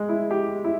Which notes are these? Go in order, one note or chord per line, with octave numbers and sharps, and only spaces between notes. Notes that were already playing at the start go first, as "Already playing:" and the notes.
Already playing: G#3
E4
G4
E4